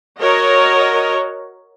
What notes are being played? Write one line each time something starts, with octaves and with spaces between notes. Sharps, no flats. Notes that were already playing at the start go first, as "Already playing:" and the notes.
F#4 A#4 C#5 D#5